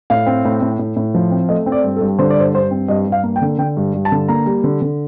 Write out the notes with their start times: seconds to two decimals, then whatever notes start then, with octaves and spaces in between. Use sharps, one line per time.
0.10 A2 F5
0.27 C4
0.45 A2
0.62 A2
0.79 A2
0.96 A2
1.15 F3
1.31 C4
1.49 A3 D#5
1.66 C4
1.72 D5
1.84 G2
1.96 A4
2.01 G2
2.19 D3 C5
2.30 D5
2.37 G2 C5
2.54 G2 C5
2.71 C4
2.88 G2 D#5
3.07 G2
3.12 F5
3.23 A#3
3.36 G5
3.42 D3
3.58 D3 G5
3.77 G2
3.94 G2
4.05 A5
4.12 D3
4.28 A#3 A#5
4.46 G3
4.64 D3
4.82 D3